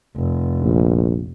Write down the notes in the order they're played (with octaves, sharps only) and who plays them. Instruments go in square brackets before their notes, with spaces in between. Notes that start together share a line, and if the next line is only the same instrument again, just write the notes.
[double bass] F1
[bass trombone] A#1